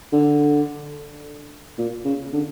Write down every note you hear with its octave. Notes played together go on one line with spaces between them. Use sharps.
D3
A#2
C#3
D3